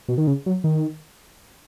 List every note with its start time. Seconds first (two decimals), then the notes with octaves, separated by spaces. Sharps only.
0.08 B2
0.18 D#3
0.27 C#3
0.46 F#3
0.64 D#3